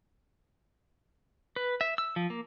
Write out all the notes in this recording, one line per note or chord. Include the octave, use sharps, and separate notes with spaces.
B4
E5
E6
F3
A#3